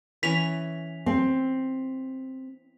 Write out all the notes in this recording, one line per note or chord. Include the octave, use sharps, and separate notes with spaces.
E3 C#4 B6 F7
C4